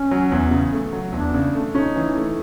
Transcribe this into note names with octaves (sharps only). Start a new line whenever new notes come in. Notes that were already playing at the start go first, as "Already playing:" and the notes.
Already playing: C#4
F#3
E2
C#3
A3
F#3
E2 D4
C#3
A3
C#4 D#4
E3
A3